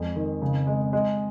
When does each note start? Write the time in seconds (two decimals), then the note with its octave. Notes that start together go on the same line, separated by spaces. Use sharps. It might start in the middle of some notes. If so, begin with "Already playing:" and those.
Already playing: F2 G#3
0.16 D#3
0.42 C#3
0.67 G#3
0.93 G#3